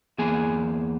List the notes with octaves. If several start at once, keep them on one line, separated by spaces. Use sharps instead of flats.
E2 A#3 G#4 G#5